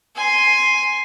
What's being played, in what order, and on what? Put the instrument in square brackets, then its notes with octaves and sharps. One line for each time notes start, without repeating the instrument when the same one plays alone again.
[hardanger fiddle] G#5 C6